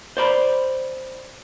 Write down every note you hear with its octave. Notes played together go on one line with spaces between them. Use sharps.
C5 D5 B5